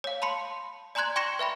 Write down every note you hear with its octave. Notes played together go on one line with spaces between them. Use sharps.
C#5 F5
A5 B5 C6 C#7
D5 G#5 A#5 C6 F#6 G#6
G5 C6 C#6 A#6 C#7 E7
B4 E5 G5 B5